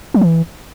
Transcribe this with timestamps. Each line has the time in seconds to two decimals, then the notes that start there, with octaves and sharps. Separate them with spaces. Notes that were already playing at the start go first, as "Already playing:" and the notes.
0.14 F#3
0.21 E3